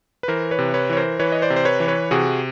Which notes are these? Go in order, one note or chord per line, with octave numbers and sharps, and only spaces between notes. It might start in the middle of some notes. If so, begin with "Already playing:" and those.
B4
E3 A#4 C5
B4 C#5
C3
B4 C#5
E3 C#5
A#4 C5
E3 B4 C#5
D#5
C5 D5
C3
C5
B4 C#5
E3
B4 C#5
C3 F#4 G#4